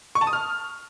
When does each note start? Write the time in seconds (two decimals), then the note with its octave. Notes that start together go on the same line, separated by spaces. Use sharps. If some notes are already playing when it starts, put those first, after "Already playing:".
0.15 C#6
0.21 A5
0.27 D#6
0.33 F6